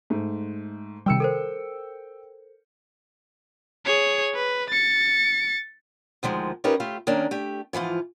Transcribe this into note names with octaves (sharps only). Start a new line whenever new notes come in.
G#2 A3
C3 D#3 G3 G5 E6 C#7
A4 A#4 C5
G#4 C#5
B4
A6 C#7
D2 D#3 F3 G#3
C#4 D#4 F4 G4 A#4 B4
A3 F4 G4
D#3 A#3 C#4 D4
A3 G4
G#2 E3 F3 F4